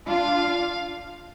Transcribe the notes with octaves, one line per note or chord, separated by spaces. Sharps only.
D4 F4 F5